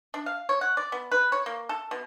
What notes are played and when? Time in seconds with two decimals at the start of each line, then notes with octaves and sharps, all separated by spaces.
0.14 D4
0.26 F5
0.49 C#5
0.61 F#5
0.77 D5
0.92 B3
1.11 B4
1.32 C#5
1.46 A#3
1.69 A4
1.91 B2